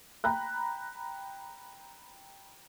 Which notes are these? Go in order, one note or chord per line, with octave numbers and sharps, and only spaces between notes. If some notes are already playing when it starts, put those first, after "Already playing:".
G5 A#5 B5 F#6